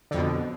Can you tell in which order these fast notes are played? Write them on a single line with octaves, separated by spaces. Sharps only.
D3 F2 B2